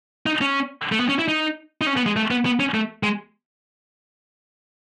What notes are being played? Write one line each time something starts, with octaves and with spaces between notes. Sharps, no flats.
D#4
C#4
A3
B3
C#4
E4
D#4
D#4
C#4
B3
G#3
A3
B3
B3
C#4
A3
G#3